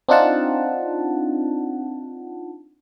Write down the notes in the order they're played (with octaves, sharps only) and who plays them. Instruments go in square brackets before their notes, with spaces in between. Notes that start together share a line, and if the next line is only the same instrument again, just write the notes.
[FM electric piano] C4 D4 D#4 F4 F#5 A5